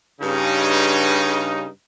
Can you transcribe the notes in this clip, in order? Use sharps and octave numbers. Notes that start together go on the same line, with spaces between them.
G2 C#3 D#4